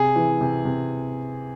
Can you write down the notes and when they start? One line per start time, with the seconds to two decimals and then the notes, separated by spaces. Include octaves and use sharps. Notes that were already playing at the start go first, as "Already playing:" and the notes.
Already playing: C3 G#4
0.16 E3
0.41 C3
0.65 C3